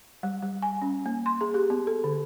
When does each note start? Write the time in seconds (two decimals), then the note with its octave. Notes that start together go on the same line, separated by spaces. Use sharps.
0.23 G3
0.42 G3
0.62 G#5
0.82 C#4
1.06 A#3
1.26 C6
1.41 G#4
1.54 G4
1.70 B3
1.87 A4
2.04 D3